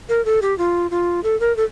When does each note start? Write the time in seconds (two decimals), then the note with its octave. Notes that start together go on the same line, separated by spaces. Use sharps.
0.09 A#4
0.25 A4
0.42 G4
0.58 F4
0.91 F4
1.23 A4
1.40 A#4
1.56 A4